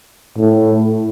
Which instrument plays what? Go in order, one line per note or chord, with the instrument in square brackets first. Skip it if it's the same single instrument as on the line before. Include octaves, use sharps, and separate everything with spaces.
[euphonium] A2